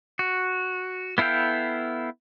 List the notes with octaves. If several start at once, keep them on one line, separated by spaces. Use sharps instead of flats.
F#4
B3 E4 A4 F5 G5